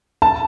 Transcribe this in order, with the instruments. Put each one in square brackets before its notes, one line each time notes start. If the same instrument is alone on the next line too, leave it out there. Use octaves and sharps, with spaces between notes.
[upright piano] A5